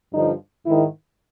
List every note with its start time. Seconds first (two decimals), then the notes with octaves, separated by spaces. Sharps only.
0.13 G2 D3 F3 D#4
0.65 G#2 D#3 E4